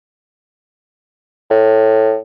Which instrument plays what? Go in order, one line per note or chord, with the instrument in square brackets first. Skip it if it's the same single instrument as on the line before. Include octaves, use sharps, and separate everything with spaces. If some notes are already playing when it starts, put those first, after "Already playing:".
[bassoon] A2